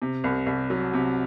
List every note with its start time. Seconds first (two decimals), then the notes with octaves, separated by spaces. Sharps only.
0.02 C3
0.24 C2
0.46 C2
0.70 F#3
0.93 C3